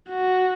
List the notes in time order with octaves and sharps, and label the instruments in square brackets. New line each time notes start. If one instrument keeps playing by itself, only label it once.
[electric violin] F#4